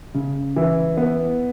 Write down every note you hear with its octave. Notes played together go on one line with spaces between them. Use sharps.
C#3
E3
B3